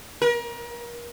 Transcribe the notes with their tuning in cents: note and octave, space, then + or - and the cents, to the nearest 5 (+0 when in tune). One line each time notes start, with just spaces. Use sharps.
A#4 +35